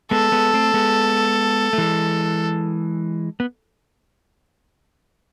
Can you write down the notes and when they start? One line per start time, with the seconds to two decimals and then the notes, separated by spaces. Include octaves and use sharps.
0.11 G#3 B3 A4
0.32 G#3 B3
0.54 A3 C4
0.74 G#3 B3
1.73 A3
1.78 E3 G#3
3.40 B3